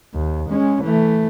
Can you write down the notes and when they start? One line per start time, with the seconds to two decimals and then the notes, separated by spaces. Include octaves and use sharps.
0.14 D#2
0.50 G#3 C#4
0.83 E3 A3